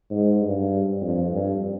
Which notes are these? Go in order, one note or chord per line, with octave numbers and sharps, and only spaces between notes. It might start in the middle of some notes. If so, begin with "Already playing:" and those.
G#2
G2
F2
G2